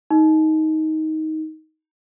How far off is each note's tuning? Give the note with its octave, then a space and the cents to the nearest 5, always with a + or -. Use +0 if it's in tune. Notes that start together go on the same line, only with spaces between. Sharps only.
D#4 +15